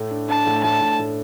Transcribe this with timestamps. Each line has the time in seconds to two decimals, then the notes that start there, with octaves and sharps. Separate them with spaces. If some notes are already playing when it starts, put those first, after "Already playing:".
Already playing: A2 A3
0.11 D4
0.28 D4 A5
0.46 A2
0.63 A2 A5
0.81 A2
0.99 A2